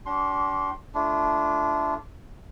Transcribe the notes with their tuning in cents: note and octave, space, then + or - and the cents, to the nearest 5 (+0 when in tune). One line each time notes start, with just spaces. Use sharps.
D4 -30 G4 -40 C6 +15
A3 -15 D4 -10 F4 -30